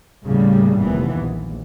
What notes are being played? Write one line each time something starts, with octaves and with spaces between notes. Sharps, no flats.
D#2 A2 C#3 G3 A#3
F1 D#2 E3 B3
A#1